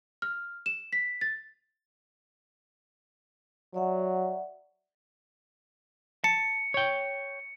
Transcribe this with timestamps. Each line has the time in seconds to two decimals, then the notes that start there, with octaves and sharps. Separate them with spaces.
0.22 F6
0.66 E7
0.93 B6
1.21 A6
3.74 F#3 D5 E5 F#5
6.24 A5 C#7
6.74 C#5 G5